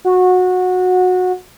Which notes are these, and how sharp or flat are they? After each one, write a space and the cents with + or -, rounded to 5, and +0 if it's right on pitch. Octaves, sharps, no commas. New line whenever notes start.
F#4 -20